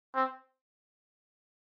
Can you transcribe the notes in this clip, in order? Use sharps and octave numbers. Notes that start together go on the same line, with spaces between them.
C4